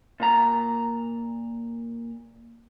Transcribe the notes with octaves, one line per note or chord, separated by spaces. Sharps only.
A#2 A#5